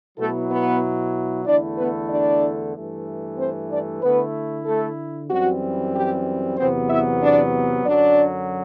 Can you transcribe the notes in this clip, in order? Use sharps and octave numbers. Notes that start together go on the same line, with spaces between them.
B2 F#3 A3 B3 E4 A4
B3 B4
E2 D3 A3 D4 E4 D5
B3 B4
D4 D5
G2 E3 A3
C4 C5
D4 D5
D3 A3 B3 E4 B4
A3 A4
F#2 E3 G3 C4 F#4
G4
E2 C3 F#3 B3 C4 C5
E4 E5
D4 D5
F#2 D3 F#3 D4 D5